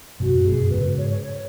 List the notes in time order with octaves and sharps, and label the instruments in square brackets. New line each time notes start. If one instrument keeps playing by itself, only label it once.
[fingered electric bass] F#2 B2 [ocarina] F#4
[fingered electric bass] G#2
[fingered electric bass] F#2 B2 [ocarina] G#4
[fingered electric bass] G#2 C#3 [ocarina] B4
[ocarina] C#5
C#5
C#5